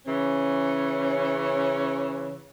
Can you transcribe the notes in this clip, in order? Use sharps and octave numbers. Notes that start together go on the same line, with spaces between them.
C#3 E3 C#4